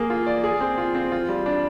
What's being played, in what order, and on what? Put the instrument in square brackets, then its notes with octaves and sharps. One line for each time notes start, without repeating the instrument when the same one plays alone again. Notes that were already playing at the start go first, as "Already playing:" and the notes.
Already playing: [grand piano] A#3 G#4
F4
D5
G#4
C4
F4
C4
F4
G3
D4